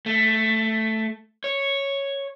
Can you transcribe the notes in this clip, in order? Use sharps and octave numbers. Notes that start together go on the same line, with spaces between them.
A3
C#5